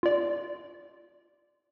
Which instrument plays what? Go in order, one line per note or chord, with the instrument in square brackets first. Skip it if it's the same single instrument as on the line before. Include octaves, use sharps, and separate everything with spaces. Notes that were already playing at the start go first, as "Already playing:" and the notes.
[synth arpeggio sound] F4 D5